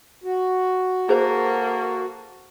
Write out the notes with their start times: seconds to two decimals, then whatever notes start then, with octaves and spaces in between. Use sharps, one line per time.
0.24 F#4
1.09 A#3 G#4 A4 C5